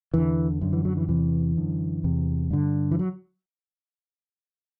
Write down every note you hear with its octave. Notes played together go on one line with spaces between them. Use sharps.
E2 D3 E3
F#2 D3
E3
F#3
E3
E2 C3 E3
F#2 D3
E2 C3
G2 D3
E3
F#3